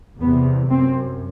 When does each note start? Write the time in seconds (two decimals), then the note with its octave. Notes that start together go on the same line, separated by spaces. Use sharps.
0.20 E2 C3 B3
0.69 F#2 C4